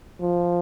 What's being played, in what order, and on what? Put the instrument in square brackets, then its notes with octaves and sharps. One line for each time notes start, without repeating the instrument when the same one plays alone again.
[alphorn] F3